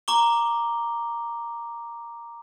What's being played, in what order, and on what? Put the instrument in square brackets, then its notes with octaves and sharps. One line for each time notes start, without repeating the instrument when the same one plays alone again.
[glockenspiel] A#5 C#6 D6 G7